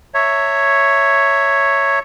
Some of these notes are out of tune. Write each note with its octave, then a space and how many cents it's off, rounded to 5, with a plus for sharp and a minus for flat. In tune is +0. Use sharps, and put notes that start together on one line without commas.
C#5 +0 E5 +0 A#5 -45